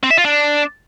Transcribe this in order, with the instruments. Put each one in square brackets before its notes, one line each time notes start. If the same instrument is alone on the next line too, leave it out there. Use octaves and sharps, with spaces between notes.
[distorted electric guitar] C4
E5
F4
D4